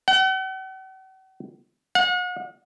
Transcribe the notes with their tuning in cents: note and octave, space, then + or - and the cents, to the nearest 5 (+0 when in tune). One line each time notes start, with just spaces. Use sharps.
F#5 +45
F#5 -40